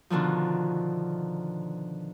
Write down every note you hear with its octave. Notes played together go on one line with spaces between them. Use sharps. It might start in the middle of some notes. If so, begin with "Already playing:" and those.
B2 D3 D#3 F3